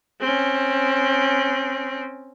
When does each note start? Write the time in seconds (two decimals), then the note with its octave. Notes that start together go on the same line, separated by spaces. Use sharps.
0.21 C4 C#4